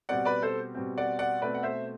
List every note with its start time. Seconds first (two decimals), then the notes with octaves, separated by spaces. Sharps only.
0.09 B2 G3 C4 D5 F#5
0.25 B4 D5
0.42 A4 C5
0.75 B2 G3 C4
0.98 D5 F#5
1.19 D5 F#5
1.42 B2 A3 C4 B4 D5
1.55 F#5
1.63 C5 E5